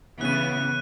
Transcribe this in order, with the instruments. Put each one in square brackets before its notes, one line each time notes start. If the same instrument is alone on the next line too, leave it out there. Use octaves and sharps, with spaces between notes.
[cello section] C#3 E3 B3 [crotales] F#6 D#7